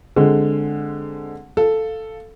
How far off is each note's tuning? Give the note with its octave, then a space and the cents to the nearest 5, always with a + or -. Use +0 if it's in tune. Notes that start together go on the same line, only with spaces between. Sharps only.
D3 +0 G#3 +0 C4 +0
A4 +0 F5 +0